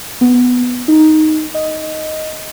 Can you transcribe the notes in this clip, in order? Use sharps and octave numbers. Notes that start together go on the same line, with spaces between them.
B3
D#4
D#5